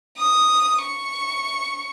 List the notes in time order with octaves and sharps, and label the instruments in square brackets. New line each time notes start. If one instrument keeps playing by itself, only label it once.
[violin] D#6
C#6